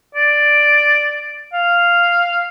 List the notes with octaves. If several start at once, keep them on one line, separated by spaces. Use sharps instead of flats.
D5
F5